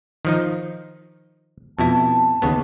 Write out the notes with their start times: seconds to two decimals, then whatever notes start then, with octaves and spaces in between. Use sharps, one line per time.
0.25 D#3 F3 D#4
1.78 F2 B2 E4 A5
2.42 D#2 C#3 B3